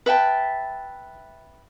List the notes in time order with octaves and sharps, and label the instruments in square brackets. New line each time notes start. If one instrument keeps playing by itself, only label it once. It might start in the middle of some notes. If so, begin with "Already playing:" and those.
[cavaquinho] B4 E5 G5 A5